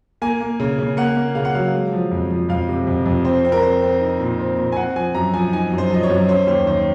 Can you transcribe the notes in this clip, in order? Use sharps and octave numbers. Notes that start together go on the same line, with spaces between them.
A#3 G#5
A#3
C#3
C#3
A#3 F#5
A#3
C#3 F5
F#5
F#3 F5
G#3
F3
F2
F3
F2 F5
C3
F2
F2
C4 C5
C4
A#4
C4 C5
C4
D#4
A#2
C4
A#2
G#5
C4 F#5
F3 G#5
F#2 A#5
F3 G#5
D#4 G#5
F#2
C5
F3 D#5
C#5
F#2
C#4 C5
D#2 C5
D#3 C5